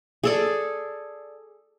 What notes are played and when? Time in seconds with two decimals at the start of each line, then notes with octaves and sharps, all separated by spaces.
0.24 G#4 A4 D5